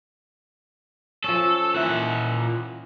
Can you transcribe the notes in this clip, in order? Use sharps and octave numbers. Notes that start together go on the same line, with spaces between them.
F3 C#4 A4
A#2 E3 F#5